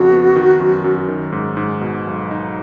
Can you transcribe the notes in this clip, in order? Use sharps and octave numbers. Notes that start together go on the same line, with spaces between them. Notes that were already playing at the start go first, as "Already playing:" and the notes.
Already playing: F2 C#3 F#4
B3
D#3
F#2
F#2
D#3
G#2
G#2
B2
B1
D#4